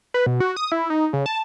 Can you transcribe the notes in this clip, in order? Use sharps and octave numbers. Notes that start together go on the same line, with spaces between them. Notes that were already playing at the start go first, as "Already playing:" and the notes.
B4
B2
F#4
D#6
E4
D#4
C#3
A5